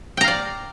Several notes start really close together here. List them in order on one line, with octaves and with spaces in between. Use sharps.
G5 A#5 F5 D5